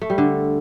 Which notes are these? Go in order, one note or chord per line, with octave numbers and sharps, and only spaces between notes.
A3
G3
D3